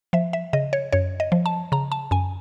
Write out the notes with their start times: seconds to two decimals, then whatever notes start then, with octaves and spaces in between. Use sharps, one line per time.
0.13 F3 E5
0.33 E5
0.53 C#3 D#5
0.73 C#5
0.92 F#2 C#5
1.20 D#5
1.32 F3
1.46 A5
1.72 C#3 A#5
1.92 A5
2.11 F#2 G#5